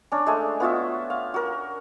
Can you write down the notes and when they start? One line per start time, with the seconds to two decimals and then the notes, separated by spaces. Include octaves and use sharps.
0.12 C#4 D4
0.26 G#3 A3 G#5
0.60 B3 F4 F#4 E5
1.10 F5
1.34 F#4 A#4